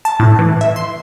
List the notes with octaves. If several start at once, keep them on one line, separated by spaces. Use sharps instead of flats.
A5
A2
E3
E5
C6